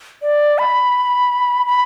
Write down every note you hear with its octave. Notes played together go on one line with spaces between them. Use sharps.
D5
B5
B5